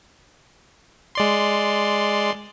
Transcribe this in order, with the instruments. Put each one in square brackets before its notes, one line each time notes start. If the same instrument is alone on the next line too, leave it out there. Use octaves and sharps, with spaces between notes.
[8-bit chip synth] G#3 D5 C6